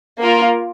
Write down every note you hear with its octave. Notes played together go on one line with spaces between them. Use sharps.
A#3 F4 A#4